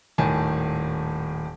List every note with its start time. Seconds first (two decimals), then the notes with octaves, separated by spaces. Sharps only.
0.18 D#1 A2 D#3 G#5 A5